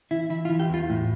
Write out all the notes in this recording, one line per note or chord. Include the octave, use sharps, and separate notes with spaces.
E3 E4
E3 E4
F4
E3
G4
E2 F4
A2